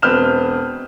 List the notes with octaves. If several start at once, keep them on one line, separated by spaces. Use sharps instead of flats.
E1 C4 B4 F6 G6 E7